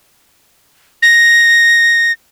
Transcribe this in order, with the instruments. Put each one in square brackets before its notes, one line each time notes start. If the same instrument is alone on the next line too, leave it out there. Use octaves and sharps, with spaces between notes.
[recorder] A#6